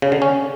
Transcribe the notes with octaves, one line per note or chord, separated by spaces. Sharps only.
C#3
D3
C#4